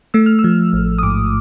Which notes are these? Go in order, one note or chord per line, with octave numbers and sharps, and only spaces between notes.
A3 E6
F6
E6
F3
A1
D#6
G#2 D6